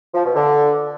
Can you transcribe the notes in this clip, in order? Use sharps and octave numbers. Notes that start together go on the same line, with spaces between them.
F3
B2
D3